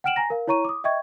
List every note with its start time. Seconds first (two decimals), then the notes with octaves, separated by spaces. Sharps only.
0.04 F#5 G5 F6 D7 E7 F#7
0.16 G#5 A#5 A#6
0.30 A#4 F5
0.47 E4 C#5 A#5 C#6 D#7
0.65 D6 D#6
0.84 D#5 E5 G5 C#6 G#6